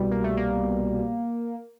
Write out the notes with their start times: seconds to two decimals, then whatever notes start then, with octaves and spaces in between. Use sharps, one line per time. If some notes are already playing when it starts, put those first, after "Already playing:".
Already playing: C2 B2 G3
0.11 A#3
0.24 A3
0.37 A#3